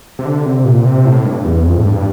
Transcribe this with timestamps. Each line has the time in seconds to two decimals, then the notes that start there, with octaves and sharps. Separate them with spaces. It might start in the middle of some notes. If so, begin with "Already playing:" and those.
0.19 C3
0.25 D3
0.46 C3
0.65 A#2
0.85 C3
1.05 A2
1.25 G2
1.45 E2
1.66 F2
1.78 A2
1.85 G2